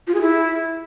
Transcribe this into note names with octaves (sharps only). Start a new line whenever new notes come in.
F4
G#4
E4